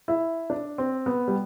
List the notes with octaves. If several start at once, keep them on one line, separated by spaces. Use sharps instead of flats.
E4
D4
C4
B3
G3